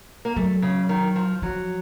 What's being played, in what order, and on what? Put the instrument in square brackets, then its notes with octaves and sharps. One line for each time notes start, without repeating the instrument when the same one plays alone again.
[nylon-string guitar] A#3
[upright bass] F#3 [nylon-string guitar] A3
[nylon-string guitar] C#3
D#3
F3
[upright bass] F3 [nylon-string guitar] F#3